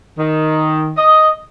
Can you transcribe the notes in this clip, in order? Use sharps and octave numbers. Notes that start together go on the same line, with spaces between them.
D#3
D#5